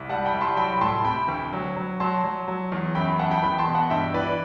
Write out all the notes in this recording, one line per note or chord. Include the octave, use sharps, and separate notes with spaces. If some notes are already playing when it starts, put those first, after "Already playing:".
Already playing: C2
G3 F#5 A5
G5 B5
C2
A5 C6
F#3 G5 B5
A2 A5 C6
C3 G5 B5
D2
F#3
F#3
F#3 A5 C6
F#3
F#3
E2
F#2 G5 B5
F#2 F#5 A5
G5 B5
E2 G5 B5
A5 C6
B2
F#5 A5
G2 E5 G5
E3 B4 D5